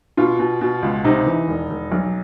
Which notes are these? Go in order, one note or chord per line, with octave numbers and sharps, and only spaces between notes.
B2 F4
B2
B2
C#2
C3 D#4
E3
E1
E1
B1